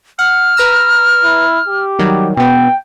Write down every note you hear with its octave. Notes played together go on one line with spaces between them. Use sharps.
F#5 F6
B4 A#5 E6
E4
G4
D#3 F#3 G3
B2 B3 G5